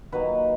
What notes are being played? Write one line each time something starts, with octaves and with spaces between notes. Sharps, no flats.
D#3 F#3 A#3 D#4 B4